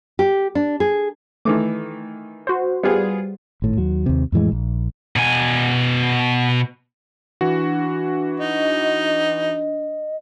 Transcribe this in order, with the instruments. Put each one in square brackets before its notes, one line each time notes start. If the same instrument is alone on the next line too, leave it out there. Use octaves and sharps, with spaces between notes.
[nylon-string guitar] G4
D4
G#4
[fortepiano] D#3 E3 D6 [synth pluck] A3
[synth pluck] F#4 C5
[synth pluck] G3 [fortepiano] B3 F4 G#4
[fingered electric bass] G#1 A2
D#2 F#3
D#2 C3
F2 A2 E3 G#3
A#1
[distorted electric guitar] B2 G#5
[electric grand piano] E3 F#4 [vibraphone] D4
[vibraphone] D4
[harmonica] D#4 [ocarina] D#5